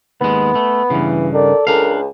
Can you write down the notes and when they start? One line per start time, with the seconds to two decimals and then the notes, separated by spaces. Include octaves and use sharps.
0.21 D#2 G#3 B3
0.55 A3
0.90 G2 C#3 E3
1.34 D#3 A4 D5
1.67 C#2 D4 A#4 F5